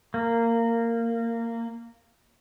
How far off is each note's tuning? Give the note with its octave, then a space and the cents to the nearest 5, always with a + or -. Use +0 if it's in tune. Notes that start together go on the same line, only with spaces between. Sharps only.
A#3 -15